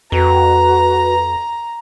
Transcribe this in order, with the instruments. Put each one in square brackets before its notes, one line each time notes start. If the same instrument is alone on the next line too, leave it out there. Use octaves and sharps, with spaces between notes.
[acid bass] F2 [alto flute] F#4 [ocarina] B4 [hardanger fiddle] A#5